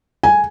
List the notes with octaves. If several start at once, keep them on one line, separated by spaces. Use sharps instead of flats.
G#5